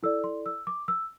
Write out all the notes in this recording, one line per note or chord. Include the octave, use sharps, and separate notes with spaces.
E4 A4 D5 E6
C6
E6
D6
E6